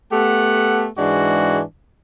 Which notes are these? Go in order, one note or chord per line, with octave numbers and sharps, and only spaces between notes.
A3 B3 G4 A4 F#5
G#2 E3 G#3 D4 F#4